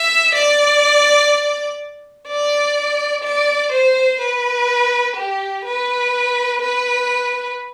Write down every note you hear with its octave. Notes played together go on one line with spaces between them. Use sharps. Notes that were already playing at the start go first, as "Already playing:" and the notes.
Already playing: E5
D5
D5
D5
C5
B4
G4
B4
B4